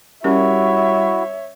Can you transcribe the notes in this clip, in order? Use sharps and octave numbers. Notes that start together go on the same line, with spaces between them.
G3 C#4 E4 F#4 A#4 C#5 E5